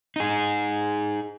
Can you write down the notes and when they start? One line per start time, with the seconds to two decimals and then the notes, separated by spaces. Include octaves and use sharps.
0.16 D#4 G#4